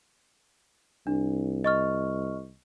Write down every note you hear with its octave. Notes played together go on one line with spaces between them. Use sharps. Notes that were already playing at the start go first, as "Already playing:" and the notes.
C2 D4
D#5 C#6 F6